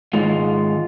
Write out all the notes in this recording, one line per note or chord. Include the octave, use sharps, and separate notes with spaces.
G#2 D#3 G#3 F4